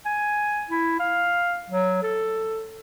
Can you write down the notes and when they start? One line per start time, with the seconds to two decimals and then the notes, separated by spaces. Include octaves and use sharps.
0.05 G#5
0.70 E4
0.99 F5
1.70 F#3
2.03 A4